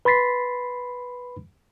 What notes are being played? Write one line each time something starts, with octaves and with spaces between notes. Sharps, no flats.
B4 B5 C6 A6 B6 C7